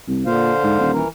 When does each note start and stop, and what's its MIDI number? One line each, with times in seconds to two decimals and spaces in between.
0.08 0.26 36
0.26 0.52 46
0.26 0.91 50
0.26 0.91 72
0.26 0.91 77
0.63 0.78 44
0.80 1.01 27
0.93 1.08 52
0.93 1.08 70